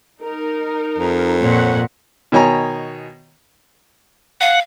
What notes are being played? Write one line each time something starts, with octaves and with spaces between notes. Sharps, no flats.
D#4 A#4
F2
A#2 C#5 F#5
B2 D#3 C#5 G#5 A#5
F5 F#5